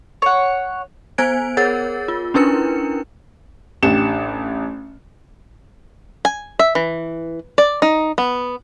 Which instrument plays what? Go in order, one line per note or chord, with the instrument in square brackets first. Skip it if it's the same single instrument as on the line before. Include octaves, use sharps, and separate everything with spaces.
[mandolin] C#5 F#5
[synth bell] B3 C5 G#5 G#6 D7
G#4 A#4 C#5 F#5 A6
F4
C#4 D4 E4 A#4 B4 C#7
[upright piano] A1 D4 G4 C#7 E7
[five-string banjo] G#5
E5
E3
D5
D#4
B3